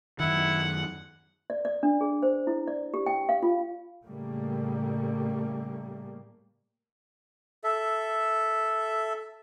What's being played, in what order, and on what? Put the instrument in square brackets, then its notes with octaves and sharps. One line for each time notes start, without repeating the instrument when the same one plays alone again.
[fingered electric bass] F#2 D#3 [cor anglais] E4 [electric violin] F#5
[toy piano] D5
D5
D4
G#4
C5
E4
D5
G4
G5
F5
F4
[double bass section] A2 C#3 G3 A3 A#3
[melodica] A4 E5